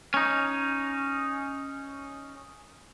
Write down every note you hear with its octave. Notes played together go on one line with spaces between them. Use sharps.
C#4 D#4